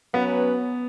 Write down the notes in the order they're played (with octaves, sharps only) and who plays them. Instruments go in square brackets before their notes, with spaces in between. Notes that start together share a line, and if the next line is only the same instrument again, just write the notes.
[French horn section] F#3 C#4 B4 [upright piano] B3